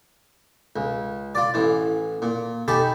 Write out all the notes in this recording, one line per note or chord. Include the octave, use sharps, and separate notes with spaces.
C#2
F4 D5
A1 E3
A#2
D#4 G4 A4 G#5 B5